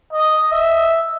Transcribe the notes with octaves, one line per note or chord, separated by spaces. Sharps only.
D#5
E5